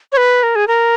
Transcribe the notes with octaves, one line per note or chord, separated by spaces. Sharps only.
C#5
B4
A#4
G#4
A#4